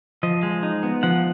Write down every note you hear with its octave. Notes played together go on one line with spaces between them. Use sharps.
F3 D#5
G#3
D#4
B3
F3 F#5